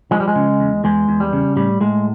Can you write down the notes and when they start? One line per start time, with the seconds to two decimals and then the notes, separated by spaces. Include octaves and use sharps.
0.11 F3 G#3
0.20 G3
0.28 G#3
0.36 C#3
0.60 E2
0.84 E2 G#3
1.09 E2
1.20 G3
1.33 C#3
1.56 A2 G3
1.81 A2 G#3